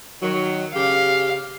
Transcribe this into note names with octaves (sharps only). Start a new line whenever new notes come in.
D#3 F#3
C#3 G4 F5